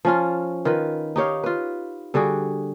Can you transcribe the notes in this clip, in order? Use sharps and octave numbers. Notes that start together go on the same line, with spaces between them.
F3 C#4 F4
D#3 F4 B4
D#4 G4 C#5 F5
F4 B4
D3 G3 F#4 G#4